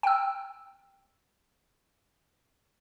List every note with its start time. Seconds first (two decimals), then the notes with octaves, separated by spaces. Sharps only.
0.03 G5 E6